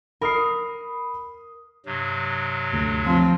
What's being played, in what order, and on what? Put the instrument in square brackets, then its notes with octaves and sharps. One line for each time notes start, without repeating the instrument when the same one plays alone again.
[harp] A#4 [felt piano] B5 D#6 C7
[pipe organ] G2 C3 F#3
[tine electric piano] D2
[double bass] F3 C4